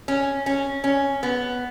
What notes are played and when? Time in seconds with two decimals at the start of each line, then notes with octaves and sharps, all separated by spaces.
0.08 C#4
0.46 C#4
0.84 C#4
1.23 B3